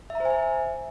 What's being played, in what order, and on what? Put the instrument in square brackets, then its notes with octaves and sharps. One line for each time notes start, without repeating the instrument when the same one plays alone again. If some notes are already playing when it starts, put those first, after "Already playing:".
[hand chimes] E5
A#5
C5
G#5
E5